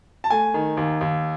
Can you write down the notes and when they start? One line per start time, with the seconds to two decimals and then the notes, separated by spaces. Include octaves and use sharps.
0.24 A5
0.30 A3 G#5
0.54 D#3
0.77 D#2
1.01 D#2